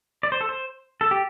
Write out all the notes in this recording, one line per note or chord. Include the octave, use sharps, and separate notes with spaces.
D5
C5
A4
C5
A4
G4